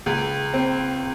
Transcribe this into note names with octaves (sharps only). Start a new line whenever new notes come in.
C#2
C4